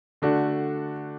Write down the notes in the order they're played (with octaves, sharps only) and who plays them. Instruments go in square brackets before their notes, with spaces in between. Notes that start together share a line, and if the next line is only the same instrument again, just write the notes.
[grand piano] D3 A3 D4 F#4